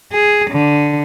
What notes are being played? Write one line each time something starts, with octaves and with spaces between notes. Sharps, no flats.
G#4
D3